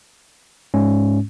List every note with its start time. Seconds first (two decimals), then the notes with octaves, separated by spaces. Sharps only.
0.74 G#2 G#3 C#4